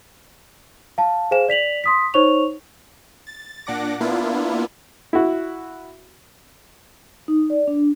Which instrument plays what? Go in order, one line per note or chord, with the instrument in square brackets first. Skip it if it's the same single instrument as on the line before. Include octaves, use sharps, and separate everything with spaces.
[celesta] F5 A5
G#4 C5 F5 G#5 E7
D5 B6 F7 F#7
C6 D#6 B6
D#4 C5 C#5 C#6 F7
[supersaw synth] A6
A#2 D4 F#5 D6 A#6
A#3 B3 D4 E4 F4
[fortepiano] E4 F#4
[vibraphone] D#4
D5
D4